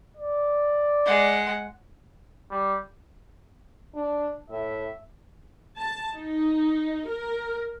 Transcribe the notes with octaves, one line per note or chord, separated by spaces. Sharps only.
D5
G#3 F#5
G3
D4
A2 E5
A5
D#4
A#4